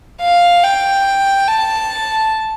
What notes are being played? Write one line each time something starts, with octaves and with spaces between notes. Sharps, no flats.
F5
G5
A5